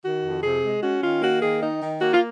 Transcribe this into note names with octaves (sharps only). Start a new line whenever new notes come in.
D#3 F#4
F2
C3 G#4
G#3
C#4 F#4
D#3 F4
A#3 F#4
D#3 G#4
D#4
D#3
A#3 F#4
F4